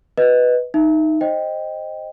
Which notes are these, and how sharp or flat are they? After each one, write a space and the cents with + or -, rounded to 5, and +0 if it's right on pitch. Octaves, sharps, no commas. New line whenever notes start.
B4 +0 D#5 +0
D#4 +0 E5 +15
C5 +10 D#5 +0 G5 +0